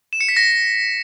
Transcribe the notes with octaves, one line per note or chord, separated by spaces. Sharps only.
E7
C#7
B6
A#6